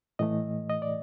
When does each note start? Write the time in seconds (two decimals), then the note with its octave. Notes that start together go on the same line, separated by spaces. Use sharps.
0.19 A2 E3 A3 D#5
0.70 D#5
0.82 D5